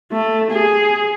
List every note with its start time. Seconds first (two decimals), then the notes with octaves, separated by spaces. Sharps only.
0.12 A3
0.52 G#4